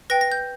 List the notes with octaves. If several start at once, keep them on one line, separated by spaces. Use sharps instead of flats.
B4 G5 A#6
A#6
G6